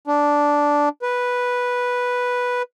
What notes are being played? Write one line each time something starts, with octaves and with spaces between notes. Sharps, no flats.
D4
B4